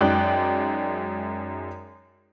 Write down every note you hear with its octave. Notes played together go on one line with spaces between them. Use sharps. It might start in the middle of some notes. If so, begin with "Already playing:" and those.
F#2 G#3 D#4 D5 G5 F#6